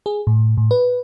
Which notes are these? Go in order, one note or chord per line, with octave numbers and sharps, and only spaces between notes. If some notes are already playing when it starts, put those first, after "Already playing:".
G#4
A2
A2
B4